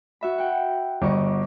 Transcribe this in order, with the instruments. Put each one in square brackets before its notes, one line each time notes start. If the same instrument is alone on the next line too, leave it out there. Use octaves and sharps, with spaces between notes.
[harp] F#4 E5 B5
F#5 G5
[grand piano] G1 [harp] D#5 C#6 D6